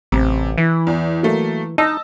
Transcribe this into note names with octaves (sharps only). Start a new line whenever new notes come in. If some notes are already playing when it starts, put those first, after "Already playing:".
A1 C3
E3 E4
E2
F#3 A3 A#3
D#4 D#5 A5 E6